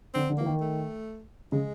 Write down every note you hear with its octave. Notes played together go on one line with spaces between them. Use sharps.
D3 C4
D3
E3 A#3
D#3
A3
C#3 G#3